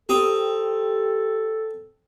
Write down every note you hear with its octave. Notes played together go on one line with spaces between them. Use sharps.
C4 G4 A4 A#5 D#6